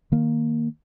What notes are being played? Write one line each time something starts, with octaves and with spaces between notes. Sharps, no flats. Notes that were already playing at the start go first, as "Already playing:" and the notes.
D#3 A#3